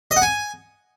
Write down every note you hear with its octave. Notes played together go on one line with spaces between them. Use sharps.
D#5
F#5
G#5